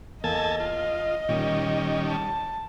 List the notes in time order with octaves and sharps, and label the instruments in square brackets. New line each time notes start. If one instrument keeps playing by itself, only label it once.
[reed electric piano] E2 A#3 [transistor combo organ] A4 G#5 A5 [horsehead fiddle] D#5
[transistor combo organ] F4
[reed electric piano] A#2 [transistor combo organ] D#3 G3 C#4
[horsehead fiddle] A5